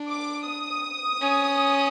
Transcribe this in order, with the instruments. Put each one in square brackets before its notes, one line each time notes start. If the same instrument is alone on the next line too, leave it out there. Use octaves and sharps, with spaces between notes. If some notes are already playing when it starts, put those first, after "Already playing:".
Already playing: [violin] D4
[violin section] D6
D#6
[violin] C#4